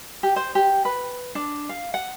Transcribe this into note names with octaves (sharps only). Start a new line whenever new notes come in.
G4
C5
G4
B4
D4
F5
F#5